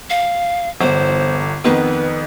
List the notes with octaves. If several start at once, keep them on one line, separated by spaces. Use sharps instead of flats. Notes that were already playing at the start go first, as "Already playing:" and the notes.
F5
G1 E2 C5
F2 D#3 B3 B4